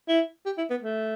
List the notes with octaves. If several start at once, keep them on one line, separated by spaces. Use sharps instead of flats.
E4
G4
E4
B3
A3